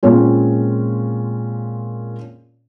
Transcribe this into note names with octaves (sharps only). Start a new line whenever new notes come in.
A#2 G#3 C4 C#4 F4